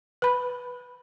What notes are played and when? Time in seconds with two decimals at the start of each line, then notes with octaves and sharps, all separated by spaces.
0.22 B4 B5